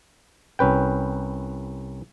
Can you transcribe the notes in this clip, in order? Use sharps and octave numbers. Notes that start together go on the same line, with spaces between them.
C2 C#4 B4 G5